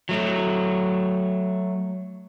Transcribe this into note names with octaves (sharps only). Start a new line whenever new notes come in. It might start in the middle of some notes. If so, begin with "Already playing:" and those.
F#3 A3